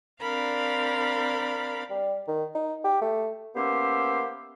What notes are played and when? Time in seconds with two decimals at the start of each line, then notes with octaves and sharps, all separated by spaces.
0.21 C4 D4 A#4 F5 B5
1.90 G3
2.28 D#3
2.55 D#4
2.84 G4
3.01 A3
3.55 A#3 B3 C#4 G4 C5 E5